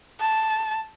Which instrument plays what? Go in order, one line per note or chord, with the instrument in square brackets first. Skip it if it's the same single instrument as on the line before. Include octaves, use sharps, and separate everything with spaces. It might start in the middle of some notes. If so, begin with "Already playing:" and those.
[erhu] A5